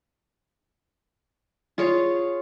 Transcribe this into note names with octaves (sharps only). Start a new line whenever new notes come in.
F4 G#4 C#5 F5